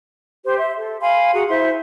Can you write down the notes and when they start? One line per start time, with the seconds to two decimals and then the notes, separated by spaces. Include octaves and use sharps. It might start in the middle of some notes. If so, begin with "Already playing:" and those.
0.45 G4 C5 C6
0.58 E5 C6
0.77 A4
1.00 F5 G#5 B5 C6
1.34 F#4 G#4 F#5 A#5
1.48 E4 C5 E5 C6